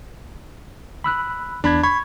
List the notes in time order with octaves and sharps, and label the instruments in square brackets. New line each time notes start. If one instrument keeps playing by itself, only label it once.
[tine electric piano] B5 E6 F#6
[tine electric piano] E2 B5 G#6 [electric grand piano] D4
[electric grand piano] B5 [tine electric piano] C#6 G#6